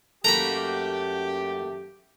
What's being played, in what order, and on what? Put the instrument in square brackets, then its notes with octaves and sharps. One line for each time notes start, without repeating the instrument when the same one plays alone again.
[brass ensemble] F#2 G4 [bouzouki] A3 A#3 F#4 [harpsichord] A#5 B5